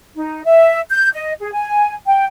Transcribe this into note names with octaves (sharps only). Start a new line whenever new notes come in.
D#4
E5
G6
D#5
G#4
G#5
G5